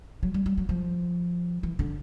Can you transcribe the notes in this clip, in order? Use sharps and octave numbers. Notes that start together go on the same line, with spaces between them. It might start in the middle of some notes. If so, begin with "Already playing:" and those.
F#3
G3
G3
F#3
F3
E3
D3